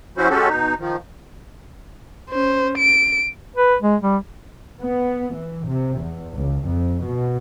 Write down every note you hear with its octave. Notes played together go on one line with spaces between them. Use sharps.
F3 C#4 E4 F#4 C5
G#3 C#4 F#4 G4 A4
B2 D#4
D#3 F3
C#4 C5
D7
B4
G#3
G3
B3
E3
C3
E2
C#2
F2
B2